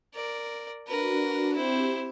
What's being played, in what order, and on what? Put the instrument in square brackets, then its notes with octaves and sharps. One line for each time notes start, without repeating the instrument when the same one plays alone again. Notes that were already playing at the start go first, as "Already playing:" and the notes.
[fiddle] A#4 D5
[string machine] D4 F#4 [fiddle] A#4 B4
[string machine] C4 G4 [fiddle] E4 C5